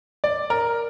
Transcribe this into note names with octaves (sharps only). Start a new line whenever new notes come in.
D5
A#4